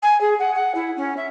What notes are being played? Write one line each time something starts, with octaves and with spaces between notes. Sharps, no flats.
G#5
G#4
F#5
F#5
E4
C#4
E5